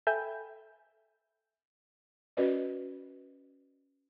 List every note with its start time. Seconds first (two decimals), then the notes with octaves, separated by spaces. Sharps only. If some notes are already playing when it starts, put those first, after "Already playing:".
0.07 A4 E5 G5 G#5 B5 G6
2.37 C#4 F#4 A#4 B4 D5 D#5